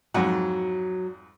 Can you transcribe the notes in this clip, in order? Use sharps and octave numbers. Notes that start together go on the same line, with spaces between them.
F2 G#2 F#3 F#5